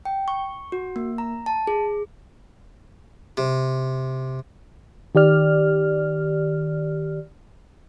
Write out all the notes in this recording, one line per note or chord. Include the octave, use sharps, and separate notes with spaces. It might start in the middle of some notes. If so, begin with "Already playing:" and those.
G5
C#6
F#4
A#3
A#5
A5
G#4
C3
D#3 G4 D5 F6